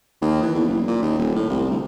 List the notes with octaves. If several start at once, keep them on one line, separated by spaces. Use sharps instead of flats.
D#2
E3
E2
F#1
A#2
D#2
D#1
A2
C2
D2